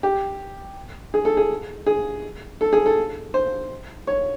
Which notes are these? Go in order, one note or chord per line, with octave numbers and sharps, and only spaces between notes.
G4
G#4
A4
G#4
G#4
A4
G#4
A4
C5
C#5